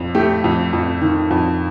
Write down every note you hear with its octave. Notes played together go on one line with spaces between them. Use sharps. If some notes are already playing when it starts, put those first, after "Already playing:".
Already playing: F2 C4
A3 G4
F2
F2
D#3
F2